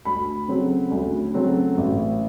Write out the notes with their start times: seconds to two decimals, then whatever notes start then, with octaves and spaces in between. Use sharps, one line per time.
0.05 D2 B5
0.48 C#3 F#3 A3 C4
0.91 D2
1.34 C#3 F#3 A3 C4
1.77 A1